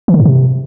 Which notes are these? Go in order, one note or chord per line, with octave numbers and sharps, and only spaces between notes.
E3
D3
G#2
C3